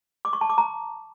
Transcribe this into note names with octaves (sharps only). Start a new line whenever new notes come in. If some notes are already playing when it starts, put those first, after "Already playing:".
D6
C#6
A5
D6
A#5